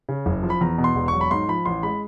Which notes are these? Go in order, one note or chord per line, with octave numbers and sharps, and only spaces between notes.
C#3
F#1
F3
B5
E2 A#5
B2
C6
E1
C#6
F#3
B5
G#2 C6
F3 B5
A1 C6
G#3 B5